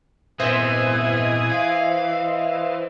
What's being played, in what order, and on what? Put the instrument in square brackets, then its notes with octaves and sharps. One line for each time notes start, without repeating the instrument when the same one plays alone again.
[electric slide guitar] A#2 B3 C4 [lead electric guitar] E3 [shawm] G#4 [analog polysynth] C5 D#5 E5
[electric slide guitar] F5